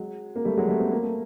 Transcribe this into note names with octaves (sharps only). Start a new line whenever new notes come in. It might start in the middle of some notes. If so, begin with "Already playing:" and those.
Already playing: F#3 G#3
A#3
G3 A3
F#3 G#3
G3 A3
B3
A#3
A3